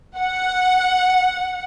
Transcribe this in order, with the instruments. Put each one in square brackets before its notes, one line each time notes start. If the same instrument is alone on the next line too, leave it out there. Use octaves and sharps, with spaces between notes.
[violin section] F#5